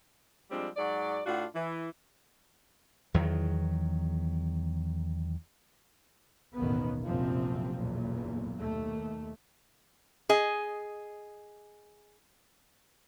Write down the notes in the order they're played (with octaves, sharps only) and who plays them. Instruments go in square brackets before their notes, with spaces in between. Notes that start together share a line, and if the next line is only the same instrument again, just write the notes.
[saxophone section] F3 G3 G#3 C4 D4
G#2 F#3 D5
A2 D4 F4 F#4
E3
[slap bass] E2 D#3 F#3
[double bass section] A1 D#2 B2 D#3 A#3 B3
F1 A#1 F#2 C3 F3 C4
F#1 B1 E2 A#2
D#2 A3
[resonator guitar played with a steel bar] G#4 D#5